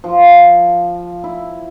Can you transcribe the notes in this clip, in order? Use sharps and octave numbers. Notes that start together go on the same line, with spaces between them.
F3
E4